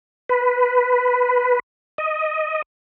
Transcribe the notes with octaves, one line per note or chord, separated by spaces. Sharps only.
B4
D#5